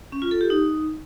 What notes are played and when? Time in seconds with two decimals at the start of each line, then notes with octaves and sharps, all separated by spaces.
0.12 C#4
0.22 F4
0.31 A4
0.41 G4
0.50 D#4